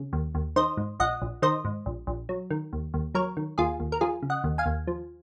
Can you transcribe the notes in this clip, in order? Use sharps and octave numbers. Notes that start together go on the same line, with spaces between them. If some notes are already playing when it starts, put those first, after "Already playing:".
Already playing: C#3
D#2
D#2
D#3 C5 D#5
G#2
A#1 D#5 F#5
A#1
D#3 C5 D#5
G#2
A#1
A#1
F#3
D#3
D#2
D#2
F#3 A#4 C#5
D#3
D#2 F4 G#4
D#2
A#4
F3 F4 G#4
C#3
D#5 F#5
D#2
F5 G#5
D#2
F3